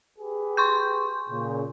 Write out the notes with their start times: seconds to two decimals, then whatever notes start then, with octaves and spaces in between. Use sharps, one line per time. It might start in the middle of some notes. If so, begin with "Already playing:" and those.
0.19 G4 G#4 B4
0.57 C6 C#6 G6
1.29 A#2 C#3